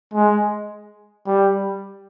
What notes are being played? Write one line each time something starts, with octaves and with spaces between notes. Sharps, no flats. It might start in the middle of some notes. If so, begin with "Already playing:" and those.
G#3
G3